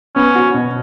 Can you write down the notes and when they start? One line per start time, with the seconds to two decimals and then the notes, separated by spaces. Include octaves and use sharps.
0.16 B3 C#4
0.35 F#4
0.54 B2